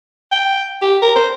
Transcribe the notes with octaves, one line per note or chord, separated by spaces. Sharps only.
G5
G4
A#4
C5